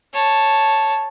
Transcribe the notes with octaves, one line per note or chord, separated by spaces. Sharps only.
C#5 A5